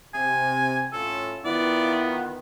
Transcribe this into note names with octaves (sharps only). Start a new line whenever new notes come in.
C3 G#5
A2 C#4 F4 A4
D#3 B3 E4 F4 D5